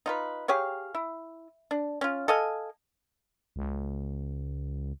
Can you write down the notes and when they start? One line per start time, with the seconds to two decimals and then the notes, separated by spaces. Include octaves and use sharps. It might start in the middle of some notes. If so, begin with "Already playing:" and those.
0.06 D#4 F4 B4
0.48 G4 G#4 C#5 F5
0.95 E4
1.71 D4
2.01 C#4 F4
2.28 A4 D#5 F5 G#5
3.56 C#2